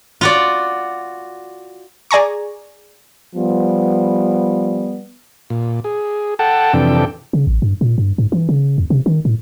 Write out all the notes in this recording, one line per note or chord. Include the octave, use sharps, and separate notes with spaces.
F4 F#4 D5
G#4 D5 G#5 A#5 C#6
F3 G3 B3
A#2
G#4
A4 F#5 G5 A5
F2 C3 E3 D4 A4 G5
C#3
A1
G2
A#2
G2
G#2
E3
C#3
E2
C3
D#3
A2